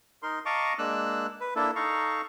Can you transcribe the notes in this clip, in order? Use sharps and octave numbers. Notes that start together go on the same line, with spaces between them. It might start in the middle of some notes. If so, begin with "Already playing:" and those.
D#4 A#4 C6
D#5 F5 A5 A#5 C#6 D6
G#3 A#3 D4 E6 F#6
B4
A#3 D4 E4 A4
D#4 A4 F5 A#5 C#6